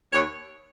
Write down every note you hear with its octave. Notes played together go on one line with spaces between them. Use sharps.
D#2 C#5